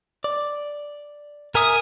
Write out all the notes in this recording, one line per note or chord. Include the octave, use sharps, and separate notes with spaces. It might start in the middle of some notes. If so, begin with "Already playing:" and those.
D5
A#4 E5 G#5 D#6